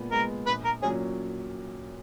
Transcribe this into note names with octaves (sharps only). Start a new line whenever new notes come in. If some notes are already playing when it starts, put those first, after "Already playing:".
Already playing: A#2 G#3 B3
G#3 B3 A#4
A#1 B4
A#4
A#2 F#3 C#4 G#4